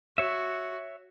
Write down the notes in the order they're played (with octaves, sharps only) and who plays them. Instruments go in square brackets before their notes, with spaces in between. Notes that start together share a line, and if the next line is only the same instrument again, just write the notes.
[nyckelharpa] F#4 [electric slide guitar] C#5 E5